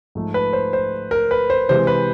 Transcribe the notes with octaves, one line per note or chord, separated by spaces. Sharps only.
G#2 F3 A3
B4
C5
C5
A#4
B4
C5
C3 E3 G#3 C5
B4